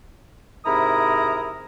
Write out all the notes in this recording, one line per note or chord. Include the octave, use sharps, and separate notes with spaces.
G#2 C3 E4 A#4 A#5 D#6